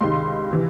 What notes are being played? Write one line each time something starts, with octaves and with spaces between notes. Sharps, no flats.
C#2 C3 D#3 C6
C3 E3